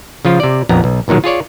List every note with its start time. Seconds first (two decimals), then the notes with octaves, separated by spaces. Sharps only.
0.25 C#3 F3 F4
0.40 C3 D5
0.69 A#1 F2 B3 A#5
0.84 B1
1.08 B1 A#2 D#3 F#3 G#3
1.24 F4 G#4 C#5 D5